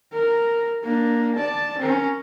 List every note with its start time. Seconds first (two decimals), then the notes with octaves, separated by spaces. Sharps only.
0.13 A#4
0.84 A#3 D4
1.36 D5 A5
1.78 C#4 A#4